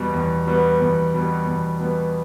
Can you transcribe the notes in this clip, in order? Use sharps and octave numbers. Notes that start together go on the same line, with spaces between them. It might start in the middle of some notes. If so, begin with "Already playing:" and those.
Already playing: E2 B2 G3 B3
E2
B2 G3 B3
E2
B2 G3 B3
E2
B2 G3 B3